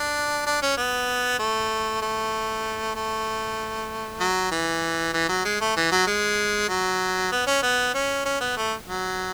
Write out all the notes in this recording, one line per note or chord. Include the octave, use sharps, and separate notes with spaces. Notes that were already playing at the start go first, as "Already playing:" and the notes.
Already playing: D4
D4
C#4
B3
A3
A3
A3
F#3
E3
E3
F#3
G#3
A3
E3
F#3
G#3
F#3
B3
C#4
B3
C#4
C#4
B3
A3
F#3